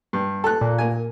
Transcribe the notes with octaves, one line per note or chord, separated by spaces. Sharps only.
G2
A4 F#6
A#2
A#3 G#5